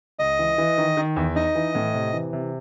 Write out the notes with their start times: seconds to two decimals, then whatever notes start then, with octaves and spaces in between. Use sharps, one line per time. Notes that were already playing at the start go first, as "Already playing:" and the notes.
0.19 C#2 D#5
0.39 E3
0.58 E3
0.78 D#3
0.97 D#3
1.16 E2
1.36 D#4 D#5
1.55 E3
1.75 A2
1.94 C3
2.13 E3
2.33 C3